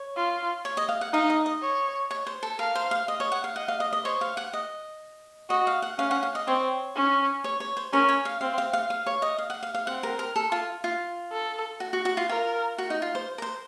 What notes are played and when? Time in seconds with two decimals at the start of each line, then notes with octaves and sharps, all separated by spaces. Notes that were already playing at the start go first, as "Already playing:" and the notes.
Already playing: C#5
0.16 F4
0.65 C#5
0.77 D#5
0.89 F5
1.01 F#5
1.13 D#4 F5
1.30 D#5
1.46 D#5
1.62 C#5
2.11 C#5
2.27 C5
2.43 A4
2.59 A#4 F5
2.75 C5
2.91 F5
3.08 D#5
3.20 C#5
3.32 F#5
3.44 F5
3.56 D#5 F#5
3.68 F5
3.80 D#5
3.93 D#5
4.04 C5 C#5
4.21 F5
4.37 F#5
4.53 D#5
5.50 F#4 D#5
5.67 F5
5.82 F#5
5.99 C#4 F5
6.11 F#5
6.23 F5
6.35 D#5
6.47 C4 C#5
6.96 C#4
7.44 C#5
7.60 C#5
7.77 C5
7.93 C#4 A#4
8.09 C#5
8.25 F5
8.41 C4 F5
8.58 F5
8.73 F5
8.90 F5
9.06 C#5
9.22 D#5
9.38 F5
9.50 F#5
9.63 F5
9.75 F5
9.86 C4 F#5
10.03 A#4
10.19 A#4
10.36 A4
10.52 F4
10.84 F4
11.32 A4
11.80 F#4
11.93 F#4
12.05 F#4
12.17 F4
12.29 F4 A#4
12.78 F#4
12.90 D#4
13.02 F4
13.15 C5
13.38 A#4
13.42 C5